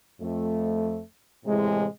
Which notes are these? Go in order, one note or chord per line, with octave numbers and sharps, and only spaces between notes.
F2 A3
A2 C3 E3 G#3